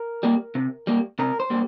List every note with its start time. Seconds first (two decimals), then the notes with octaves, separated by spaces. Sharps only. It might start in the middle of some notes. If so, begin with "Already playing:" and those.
Already playing: A#4
0.23 G3 A#3
0.55 C3
0.87 G3 A#3
1.19 C3 A#4
1.40 C5
1.50 G3 A#3